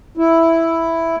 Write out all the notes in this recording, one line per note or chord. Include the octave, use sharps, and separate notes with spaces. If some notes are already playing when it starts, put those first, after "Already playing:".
E4